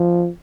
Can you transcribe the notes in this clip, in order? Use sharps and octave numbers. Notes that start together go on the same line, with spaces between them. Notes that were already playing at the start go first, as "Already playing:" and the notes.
Already playing: F3